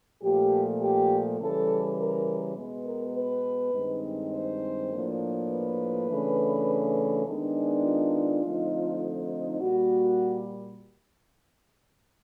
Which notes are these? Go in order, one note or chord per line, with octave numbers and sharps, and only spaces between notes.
A#2 F3 A3 G4
G4
C#3 E3 G3 A4
A#4
B2 G#3 B3
A#4
B4
G2 D#3 G#3 C4 D#4
C5
A2 F3 A#3 D4
B4
C#3 E3 A3 D4
D#3 G#3 B3 D4
F4
D3 F3 A3 C4 D#4
A#2 G3 A#3 F#4